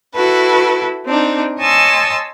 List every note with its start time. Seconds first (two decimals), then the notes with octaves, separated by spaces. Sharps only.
0.13 E4 F#4 A4 B4
1.06 C4 D4 D#4
1.58 C#5 D#5 G#5 A5 C6 E6